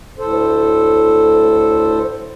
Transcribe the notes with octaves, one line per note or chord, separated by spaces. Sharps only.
D2 A2 A4 C5